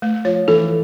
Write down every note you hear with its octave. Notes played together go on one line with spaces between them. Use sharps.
A3
F3 C#5
E3 A4